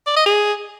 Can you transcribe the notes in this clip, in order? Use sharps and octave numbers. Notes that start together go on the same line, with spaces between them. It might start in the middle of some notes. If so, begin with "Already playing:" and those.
D5
D#5
G#4